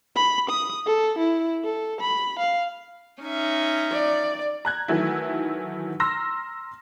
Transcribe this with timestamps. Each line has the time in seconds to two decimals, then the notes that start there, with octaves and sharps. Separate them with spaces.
0.16 B5
0.50 D#6
0.86 A4
1.19 E4
1.64 A4
2.01 B5
2.39 F5
3.23 C#4 D#4 E5
3.92 D5
4.65 A#5 F#6 G#6
4.88 D#3 E3 F#3 A3 E4
6.00 A#5 C6 E6 F6 A#6